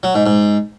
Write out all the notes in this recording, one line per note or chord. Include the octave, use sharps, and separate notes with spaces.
F#3
G#2
G#2